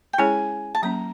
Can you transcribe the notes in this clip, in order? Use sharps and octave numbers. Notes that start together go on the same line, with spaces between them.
G5
G#3 C#4 E4 G#4 C#5 G#5
A5
F#3 A#3 C#4 A#5